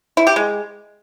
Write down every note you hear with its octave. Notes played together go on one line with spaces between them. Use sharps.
E4
G4
G#3